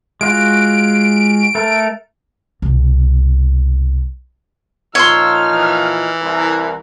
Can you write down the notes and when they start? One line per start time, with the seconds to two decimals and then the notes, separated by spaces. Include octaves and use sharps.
0.21 G#3 F4 F#4 D7
1.55 A3 A4 A#4
2.62 C2 B2
4.95 A#2 F3 D#4 C#5 C6 E6 F6
5.52 E3
6.22 C2 E4 A#4